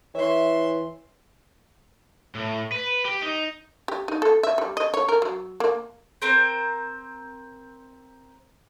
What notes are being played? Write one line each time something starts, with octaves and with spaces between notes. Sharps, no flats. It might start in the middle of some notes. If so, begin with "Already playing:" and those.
E3 C#5 E5 C6
A2
B4
G4
D#4
G4
D#4
A4
E5
G3
D#5
C#5
A#4
F#3
A#3
C4 A#4 C5